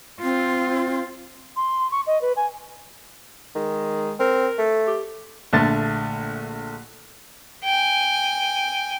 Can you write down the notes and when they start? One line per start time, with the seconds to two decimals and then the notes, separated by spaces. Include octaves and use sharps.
0.22 C4 F4
1.56 C6
1.91 C#6
2.07 D#5
2.22 B4
2.37 G#5
3.55 D#3 G#3
4.19 C4 A#4
4.58 A3
4.87 G4
5.53 A#1 D3 A3 A6
7.64 G5 G#5